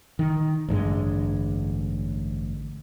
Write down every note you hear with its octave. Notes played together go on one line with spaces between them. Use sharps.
D#3
A1 G2 D3 G#3